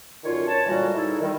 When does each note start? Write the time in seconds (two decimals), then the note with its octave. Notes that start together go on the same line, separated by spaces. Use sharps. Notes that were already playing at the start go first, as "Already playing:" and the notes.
0.24 F#2 D3 D#3 F4 C#5
0.47 C#5 A5
0.66 A#2 D3 E3 G3 G#3 F#4
0.94 D#4 E4 G#4 A4
1.20 D#3 G3